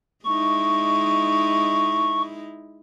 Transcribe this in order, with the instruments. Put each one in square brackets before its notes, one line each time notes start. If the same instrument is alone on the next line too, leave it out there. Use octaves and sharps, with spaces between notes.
[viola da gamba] G#3 D#4 E4 [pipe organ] C#6